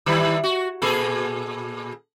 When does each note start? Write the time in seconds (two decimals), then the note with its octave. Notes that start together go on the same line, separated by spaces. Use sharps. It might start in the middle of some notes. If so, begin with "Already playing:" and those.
0.06 D#3 G3 E4
0.44 F#4
0.82 A#2 G#4 A4